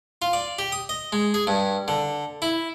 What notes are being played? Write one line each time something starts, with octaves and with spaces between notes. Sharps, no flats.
F4
D5
G4
D#6
D#5
G#3
G#4
G2
D3
E4